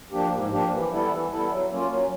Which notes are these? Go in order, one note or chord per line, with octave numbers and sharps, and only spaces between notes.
F3 A#3 D4 G4
G#2
F3 A#3 D4 G4
E3
G3 B3 E4 A4
E3
G3 B3 E4 A4
F#3
A#3 C#4 F4
F#3